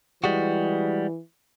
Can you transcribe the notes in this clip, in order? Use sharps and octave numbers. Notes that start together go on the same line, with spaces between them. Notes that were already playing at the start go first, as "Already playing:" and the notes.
E3 G3 G#3 F#4